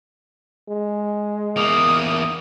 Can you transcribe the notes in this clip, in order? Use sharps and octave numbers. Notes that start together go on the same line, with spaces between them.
G#3
E2 A#3 D#6